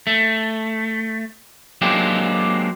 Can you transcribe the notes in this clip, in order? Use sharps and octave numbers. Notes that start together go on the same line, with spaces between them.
A3
F#3 G#3 A#3 C4 D4 G4